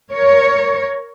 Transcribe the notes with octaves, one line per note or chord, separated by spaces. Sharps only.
A#4 C#5